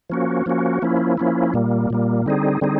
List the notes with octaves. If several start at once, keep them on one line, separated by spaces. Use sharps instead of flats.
F3 A#3 C#4 F#4
F3 A#3 C#4 F#4
F3 A#3 C#4 E4
F3 A#3 C#4 E4
A#2 G3 A#3
A#2 G3 A#3
D3 G3 C4 D#4 G#4
D3 G3 C4 D#4 G#4